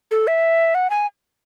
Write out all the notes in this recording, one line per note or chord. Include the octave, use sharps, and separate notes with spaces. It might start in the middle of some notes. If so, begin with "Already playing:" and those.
A4
E5
F#5
G#5